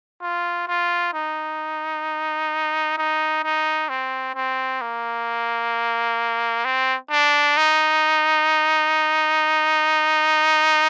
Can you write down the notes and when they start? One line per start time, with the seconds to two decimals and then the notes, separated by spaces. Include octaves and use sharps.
0.22 F4
0.68 F4
1.14 D#4
2.98 D#4
3.44 D#4
3.89 C4
4.35 C4
4.81 A#3
6.65 C4
7.11 D4
7.57 D#4